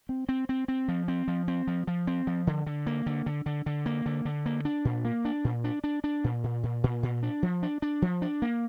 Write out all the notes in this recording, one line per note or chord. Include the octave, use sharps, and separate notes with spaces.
C4
C4
C4
C4
F3
C4
F3
C4
F3
F3
C4
F3
D3
D3
A#3
D3
D3
D3
D3
A#3
D3
D3
A#3
D4
A#2
A#3
D4
A#2
D4
D4
D4
A#2
A#2
A#2
A#2
A#2
D4
F3
D4
D4
F3
D4
A#3